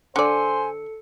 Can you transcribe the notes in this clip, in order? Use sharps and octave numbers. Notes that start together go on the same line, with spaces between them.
D3 A4 C5 D5 G#5 C#7